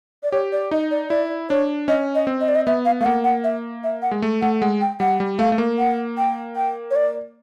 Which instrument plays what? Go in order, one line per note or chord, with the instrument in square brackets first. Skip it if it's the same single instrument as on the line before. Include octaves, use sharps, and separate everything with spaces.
[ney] D5
[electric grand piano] G4 [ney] C#5
[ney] D5
[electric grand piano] D#4 [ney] D#5
[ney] D5
[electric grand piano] E4 [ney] D5
[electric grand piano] D4 [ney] C#5
[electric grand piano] C#4 [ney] D#5
[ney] D#5
[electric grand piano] C4
[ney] D#5
D5
D#5
[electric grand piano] B3 [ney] E5
[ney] F5
[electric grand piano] A3 [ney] F5
[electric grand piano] A#3 [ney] F#5
[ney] F#5
E5
E5
F#5
[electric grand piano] G#3
A3
[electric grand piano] A3 [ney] F#5
[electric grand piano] G#3 [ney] F#5
[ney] G5
[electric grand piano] G3 [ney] F#5
[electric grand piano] G3
[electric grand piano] A3 [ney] F5
[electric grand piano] A3
A#3
[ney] F#5
G5
G5
C#5
D5